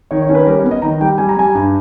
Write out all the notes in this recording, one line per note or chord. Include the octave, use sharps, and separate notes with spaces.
D#3 C#5
C#5
C#4
B4
G3 A#4
C#5
B3
D#5
D#3 A#5
G3 G5
G3 G#5
A#5
G3 G#5
G2